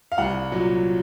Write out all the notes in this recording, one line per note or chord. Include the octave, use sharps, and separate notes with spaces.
F5
C2 F#5
A#2 F#3